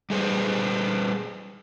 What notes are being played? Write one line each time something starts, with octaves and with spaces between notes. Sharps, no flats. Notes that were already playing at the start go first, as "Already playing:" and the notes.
G3 G#4 B4 C5